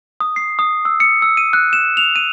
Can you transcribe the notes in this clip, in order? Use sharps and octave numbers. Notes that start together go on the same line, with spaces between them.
D#6
C7
D#6
E6
C#7
E6
D#7
F#6
E7
F7
D#7